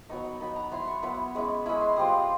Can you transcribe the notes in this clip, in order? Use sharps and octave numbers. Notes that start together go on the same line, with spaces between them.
F#3 B3 D#4 C#6
B5
F#3 B3 D#4 B5
A#5
F#3 B3 E4 C6
C#6
F#3 B3 E4 B5
G#3 C#4 E4
G#3 C#4 E4 B5
C6
G3 C4 F4 D#6